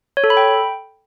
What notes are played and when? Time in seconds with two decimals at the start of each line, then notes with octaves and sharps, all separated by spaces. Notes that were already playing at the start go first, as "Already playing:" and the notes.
0.17 C#5
0.24 A4
0.30 B5
0.37 G5